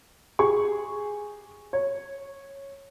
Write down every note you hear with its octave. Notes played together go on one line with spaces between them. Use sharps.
G4 G#4 C#6
C#5